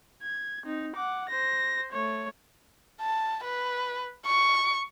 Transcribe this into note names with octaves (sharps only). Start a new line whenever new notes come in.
G#6
C4 D#4
F#5 D6
C5 A#6
A3 C#5
A5
B4
C#6